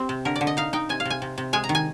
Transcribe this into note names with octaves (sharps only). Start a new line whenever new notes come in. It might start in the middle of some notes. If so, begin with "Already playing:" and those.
Already playing: C4 G4
C3
D3 A#4
D5
D3
D#5
D#4 F5
D#4 G5
C3 G#5
F5
C3 G#5
C3
C3
G#3 G#5
A#5
D#3
G#5